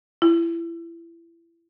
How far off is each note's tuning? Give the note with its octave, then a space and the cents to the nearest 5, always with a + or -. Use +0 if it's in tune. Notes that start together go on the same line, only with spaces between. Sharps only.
E4 +30